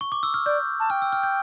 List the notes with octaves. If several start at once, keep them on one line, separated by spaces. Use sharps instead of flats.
C#6
D6
E6
F6
D5 G6
A5
G5 F6
E6
F6
G6